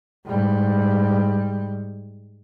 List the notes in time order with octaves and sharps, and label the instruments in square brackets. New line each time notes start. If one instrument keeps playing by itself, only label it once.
[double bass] G#2 G3